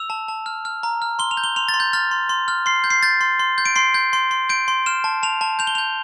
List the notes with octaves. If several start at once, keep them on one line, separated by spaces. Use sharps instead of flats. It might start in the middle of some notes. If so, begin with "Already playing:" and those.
Already playing: E6 F7
A5
A5
F6
F6
A#5
F6
C6 G7
F7
G6
G7
C6 F7
A6
C6
G6
F6 A6
C6
C6
F6
C6 C7
G6
C7
G6 A6
C6
C6
G6
D7
C6 C7
G6
C6
C6
G6 D7
C6
F6 E7
A5
A5 F7
A5
G6 F7
G7
G6 F7